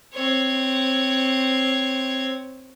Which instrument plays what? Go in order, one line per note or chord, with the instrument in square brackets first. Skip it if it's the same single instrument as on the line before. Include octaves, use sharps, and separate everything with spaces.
[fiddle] C4 C#5